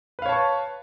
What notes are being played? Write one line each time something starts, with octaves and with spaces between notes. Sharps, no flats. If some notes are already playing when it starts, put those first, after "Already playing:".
B4 C#5 F5 A5 C#6